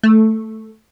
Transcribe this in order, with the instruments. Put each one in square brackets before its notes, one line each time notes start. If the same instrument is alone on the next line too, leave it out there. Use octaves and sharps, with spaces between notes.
[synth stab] A3